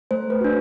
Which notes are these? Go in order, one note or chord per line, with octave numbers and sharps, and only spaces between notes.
A3 C5
B4
D4 F#4